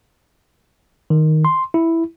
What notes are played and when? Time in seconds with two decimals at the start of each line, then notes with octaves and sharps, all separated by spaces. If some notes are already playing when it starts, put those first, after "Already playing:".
1.10 D#3
1.45 C6
1.74 E4